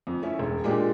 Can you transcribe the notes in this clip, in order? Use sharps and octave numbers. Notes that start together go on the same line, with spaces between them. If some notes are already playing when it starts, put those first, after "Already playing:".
F2
A3 C#4 E4
E1
A#2 G#3 A#3 D4 G4